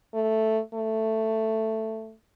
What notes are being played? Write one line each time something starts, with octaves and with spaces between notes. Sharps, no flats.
A3
A3